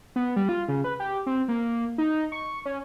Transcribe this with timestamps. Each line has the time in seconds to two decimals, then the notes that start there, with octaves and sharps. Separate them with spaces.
0.16 B3
0.36 G3
0.49 F4
0.69 C#3
0.84 B4
1.00 G4
1.26 C4
1.48 A#3
1.98 D#4
2.32 C#6
2.66 C#4